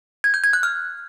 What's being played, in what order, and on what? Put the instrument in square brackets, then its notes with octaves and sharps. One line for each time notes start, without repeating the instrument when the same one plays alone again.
[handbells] G#6
G6
G#6
F#6
F6